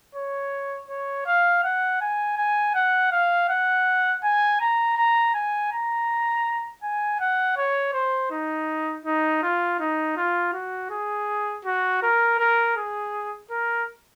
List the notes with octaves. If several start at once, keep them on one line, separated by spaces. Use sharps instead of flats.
C#5
C#5
F5
F#5
G#5
G#5
F#5
F5
F#5
G#5
A#5
A#5
G#5
A#5
G#5
F#5
C#5
C5
D#4
D#4
F4
D#4
F4
F#4
G#4
F#4
A#4
A#4
G#4
A#4